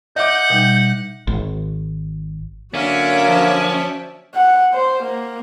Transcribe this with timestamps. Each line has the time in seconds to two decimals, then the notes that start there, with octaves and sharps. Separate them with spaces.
0.16 D#5 E5 F#5 D6 G6
0.50 B2 G3 D#4
1.27 G#1
2.74 D3 F#3 A#3 C#4 F#4 D5 E5
3.28 F3
4.35 F#5
4.74 C5
5.04 A#3